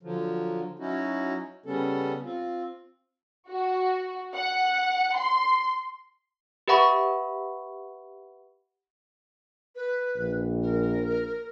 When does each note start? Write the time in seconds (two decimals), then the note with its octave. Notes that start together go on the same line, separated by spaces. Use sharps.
0.03 D3 F3 F#3
0.79 F#3 C#4 D#4 E4 F#4
1.66 C#3 G3 B3 C#4 A4
2.24 C4 F4
3.49 F#4
4.35 F#5
5.16 C6
6.68 G4 B4 E5 F#5 B5 C#6
9.76 B4
10.16 A#1
10.62 A#4